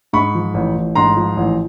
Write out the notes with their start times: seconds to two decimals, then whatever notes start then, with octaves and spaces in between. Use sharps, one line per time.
0.13 G#2 B5 C#6
0.35 F3
0.54 A1
0.76 A1
0.95 G#2 A#5 C6
1.17 F3
1.37 A1